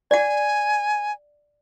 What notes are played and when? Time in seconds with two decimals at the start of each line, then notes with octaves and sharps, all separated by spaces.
0.11 D5 F#5 G#5